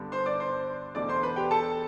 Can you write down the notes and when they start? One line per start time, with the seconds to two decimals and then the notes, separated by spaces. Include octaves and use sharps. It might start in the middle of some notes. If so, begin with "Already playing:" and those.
Already playing: G2 D3 G3 B3 D4
0.12 C5 C6
0.26 D5 D6
0.40 C5 C6
0.95 E2 B2 A3 D4 D5 D6
1.09 C5 C6
1.23 B4 B5
1.36 G4 G5
1.51 A4 A5